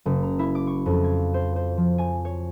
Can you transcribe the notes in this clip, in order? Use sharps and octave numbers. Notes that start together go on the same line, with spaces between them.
F#1
A#5
E4
D6
C#6
F2
G#6
C5
C5
F3
G#5
C#5